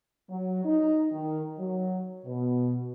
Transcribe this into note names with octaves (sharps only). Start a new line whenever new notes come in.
F#3
D#4
D#3
F#3
B2